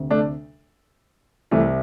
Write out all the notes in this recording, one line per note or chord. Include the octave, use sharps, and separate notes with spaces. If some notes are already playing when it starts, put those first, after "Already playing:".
Already playing: D2 C3
A3 D4
C2 C3 E3 A3